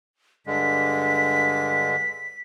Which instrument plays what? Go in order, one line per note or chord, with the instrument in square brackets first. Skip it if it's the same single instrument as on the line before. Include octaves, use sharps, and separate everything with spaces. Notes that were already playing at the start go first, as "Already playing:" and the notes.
[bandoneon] G2 D3 G#3 [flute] B6